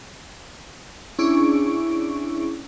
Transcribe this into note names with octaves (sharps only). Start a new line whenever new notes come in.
C#4 D4 E4 G#4 C#6 D7